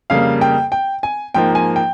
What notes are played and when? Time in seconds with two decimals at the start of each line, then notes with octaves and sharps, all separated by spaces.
0.10 F2 C#3 G3 A#3 F5
0.41 G5
0.72 G5
1.03 G#5
1.34 G#2 F3 A#3 G5
1.55 G#5
1.76 G5